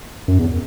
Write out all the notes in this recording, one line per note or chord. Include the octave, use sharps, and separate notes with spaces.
F#2
E2